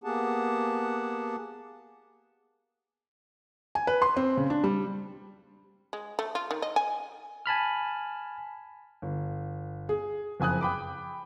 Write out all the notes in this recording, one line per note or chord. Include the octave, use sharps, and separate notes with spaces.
A#3 B3 G4 G#4 F#5 A5
G#5
B4
C6
C4
C#3
D4
G3
G#3
A3
F4
D#3
D#5
G#5
G#5 A5 B5 F6
G1
G#4
F#1 F2 G#5 D#6 F#6
G5 B5 D6